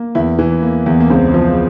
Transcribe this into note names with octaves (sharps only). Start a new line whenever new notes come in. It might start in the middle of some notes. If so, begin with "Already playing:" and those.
Already playing: A#3
E2 E4
E3
A#3
E2
A#3
C#2 C4
F3